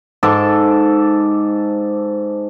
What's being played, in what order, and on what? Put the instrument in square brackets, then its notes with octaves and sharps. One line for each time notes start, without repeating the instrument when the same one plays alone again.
[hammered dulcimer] G#2 A4 A5 D6